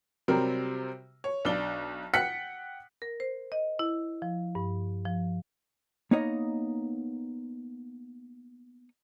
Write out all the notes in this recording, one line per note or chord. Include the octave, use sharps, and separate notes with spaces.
C3 F#3 G3 C4 A#4
C#5
B1 D4 G7
F#5 G5 F#6 B6 C#7
A#4
C5
D#5
E4
F3
G2
F3
A#3 B3 D#4 C#5 D#5